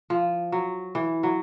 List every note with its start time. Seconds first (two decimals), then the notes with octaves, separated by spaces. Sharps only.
0.10 F3
0.52 F#3
0.95 E3
1.23 F#3